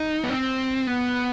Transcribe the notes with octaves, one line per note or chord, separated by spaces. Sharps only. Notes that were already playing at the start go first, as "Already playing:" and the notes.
Already playing: D#4
B3
C4
B3